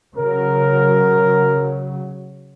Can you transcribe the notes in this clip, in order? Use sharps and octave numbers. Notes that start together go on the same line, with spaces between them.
C#3 F#3 A#4